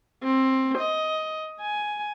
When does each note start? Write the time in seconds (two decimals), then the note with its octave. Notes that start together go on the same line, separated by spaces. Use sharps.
0.24 C4
0.78 D#5
1.61 G#5